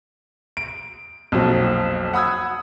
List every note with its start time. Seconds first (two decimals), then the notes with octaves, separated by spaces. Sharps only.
0.57 D7
1.32 B1 F2 A#2 F3 F#3
2.13 F#5 B5 D#6 E6 G#6